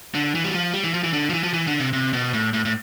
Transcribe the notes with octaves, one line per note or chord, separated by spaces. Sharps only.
D3
E3
G3
F3
G3
E3
F3
E3
D3
F3
E3
F3
E3
D3
C3
C3
B2
A2
A2
A2